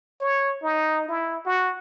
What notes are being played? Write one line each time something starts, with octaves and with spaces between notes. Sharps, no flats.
C#5
D#4
E4
F#4